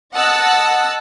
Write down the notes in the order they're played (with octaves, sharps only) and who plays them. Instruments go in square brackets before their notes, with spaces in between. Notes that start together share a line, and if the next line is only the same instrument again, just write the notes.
[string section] D#5 F#5 A5 E6 F#6